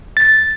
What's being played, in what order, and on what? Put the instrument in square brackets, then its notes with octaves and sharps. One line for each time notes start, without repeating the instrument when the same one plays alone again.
[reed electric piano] A6